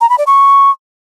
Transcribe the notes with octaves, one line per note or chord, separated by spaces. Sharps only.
A#5
B5
D5
C#6